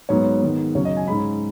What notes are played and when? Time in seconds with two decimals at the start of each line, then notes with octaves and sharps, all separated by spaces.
0.09 G#2 F#3 B3 C#5
0.41 G#2 D#3 B3
0.75 F#2 C#3 F#3 C#4 C#5
0.85 D#5
0.97 G#5
1.07 G#2 G#3 C#4 B5